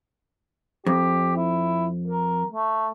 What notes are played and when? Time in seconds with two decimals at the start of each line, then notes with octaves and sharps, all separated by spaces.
0.86 F2 G4
1.36 E4
2.08 A#4
2.52 A3